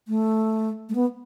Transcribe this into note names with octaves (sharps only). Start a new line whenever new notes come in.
A3
A3
B3